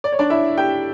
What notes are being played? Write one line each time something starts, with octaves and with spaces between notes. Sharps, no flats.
D5
C#5
D4 D5
E4 E5
G4 G5